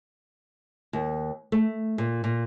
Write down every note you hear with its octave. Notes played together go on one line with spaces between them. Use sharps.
D#2
A3
A#2
A#2